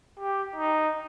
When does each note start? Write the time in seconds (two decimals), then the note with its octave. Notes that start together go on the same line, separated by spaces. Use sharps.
0.19 G4
0.56 D#4